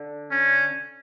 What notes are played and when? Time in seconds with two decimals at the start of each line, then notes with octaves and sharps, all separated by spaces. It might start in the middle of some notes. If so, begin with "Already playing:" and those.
Already playing: D3
0.31 C#4